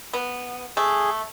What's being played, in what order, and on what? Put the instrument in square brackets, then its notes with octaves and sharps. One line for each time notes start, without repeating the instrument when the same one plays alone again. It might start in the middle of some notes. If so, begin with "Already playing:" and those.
[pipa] B3
[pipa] A3 [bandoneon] G#4